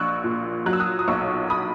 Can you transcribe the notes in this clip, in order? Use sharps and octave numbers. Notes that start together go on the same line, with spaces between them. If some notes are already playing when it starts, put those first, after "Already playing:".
Already playing: A#1 C#6 E6 F#6
A#2
F#3 F#6
E6
D#6 F#6
D#6
B1 C#6 E6
B5 D#6